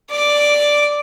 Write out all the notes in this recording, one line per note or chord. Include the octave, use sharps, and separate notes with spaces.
D5 D6